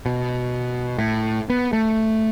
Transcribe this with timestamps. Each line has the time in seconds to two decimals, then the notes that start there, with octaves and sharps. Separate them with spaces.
0.06 B2
0.98 A2
1.50 B3
1.73 A3